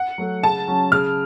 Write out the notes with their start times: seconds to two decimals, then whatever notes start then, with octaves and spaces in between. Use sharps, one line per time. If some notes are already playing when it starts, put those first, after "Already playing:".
Already playing: F#5
0.18 F#3 A3
0.43 C#3 A5
0.68 F#3 C#4
0.92 C#3 F6